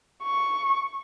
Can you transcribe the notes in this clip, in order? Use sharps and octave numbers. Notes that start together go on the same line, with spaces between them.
C#6